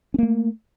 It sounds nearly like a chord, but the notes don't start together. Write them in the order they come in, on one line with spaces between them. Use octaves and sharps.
C#4 A#3 A3